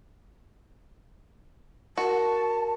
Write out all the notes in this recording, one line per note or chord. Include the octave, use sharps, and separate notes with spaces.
F#4 A#4 A5